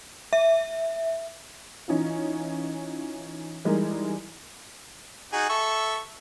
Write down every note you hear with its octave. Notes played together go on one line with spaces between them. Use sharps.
E5
E3 C#4 D#4 F4
E3 G3 G#3 D#4 A#4
D#4 F#4 G#4
A4 E5 C#6